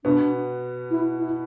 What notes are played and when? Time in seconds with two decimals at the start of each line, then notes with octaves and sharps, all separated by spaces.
0.05 B2 B3 D4
0.91 E4
1.19 E4